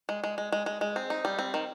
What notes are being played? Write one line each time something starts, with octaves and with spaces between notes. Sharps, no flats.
G#3
G#3
G#3
G#3
G#3
G#3
C4
D#4
G3
C4
D#3